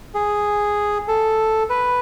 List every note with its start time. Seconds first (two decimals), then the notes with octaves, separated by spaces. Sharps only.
0.14 G#4
1.08 A4
1.70 B4